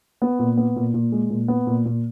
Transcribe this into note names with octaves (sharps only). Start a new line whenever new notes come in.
B3
A#2
B3
A#2
A#2
G#3
A#2
B3
A#2
A#2